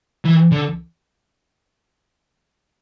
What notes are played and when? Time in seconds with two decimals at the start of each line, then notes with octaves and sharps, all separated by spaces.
0.25 E3
0.52 D3